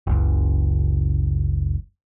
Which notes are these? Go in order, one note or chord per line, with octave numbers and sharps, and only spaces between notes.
F#1 C#2